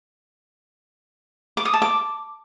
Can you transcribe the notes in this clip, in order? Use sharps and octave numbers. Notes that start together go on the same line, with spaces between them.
D6
D#6
A5
D6